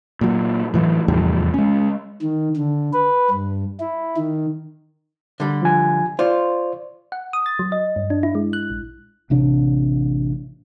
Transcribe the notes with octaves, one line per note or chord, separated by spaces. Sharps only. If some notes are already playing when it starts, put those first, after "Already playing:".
A#2 F#3
A2 E3 F#3
F1 E2 A2 G3
G#3 C#4
D#3
D3
B4
G2
E4
D#3
D3 G3
F3 G#5
F4 C5 D5
F#5
D#6
A6
F#3
D#5
G2
D4
E4
G#3
F#6
A#1
A1 C3 D4